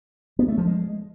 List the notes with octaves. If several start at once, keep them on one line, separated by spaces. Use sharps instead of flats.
B3
A3
F3
G#3